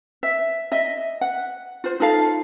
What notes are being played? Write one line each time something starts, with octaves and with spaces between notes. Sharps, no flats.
E5
D#5 E5
F#5
F4 C5
D#4 F4 A4 F5